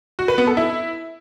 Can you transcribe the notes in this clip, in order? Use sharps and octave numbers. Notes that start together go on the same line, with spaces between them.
F#4
B4
B3
A4
E4